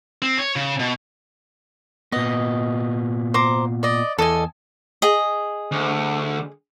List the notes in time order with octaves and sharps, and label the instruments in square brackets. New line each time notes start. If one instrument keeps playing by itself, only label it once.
[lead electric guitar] C4
C#5
C#3
B2
[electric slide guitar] A#2 B3 [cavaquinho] D#5
[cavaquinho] C5 A#5 D6
D5 D#5
[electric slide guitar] E2 [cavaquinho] A4 D#5 G#5
[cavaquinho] G#4 D#5
[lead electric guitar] D2